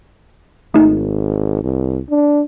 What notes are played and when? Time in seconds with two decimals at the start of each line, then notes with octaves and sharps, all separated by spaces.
0.74 G#1 A3 D#4
1.64 C2
2.10 D4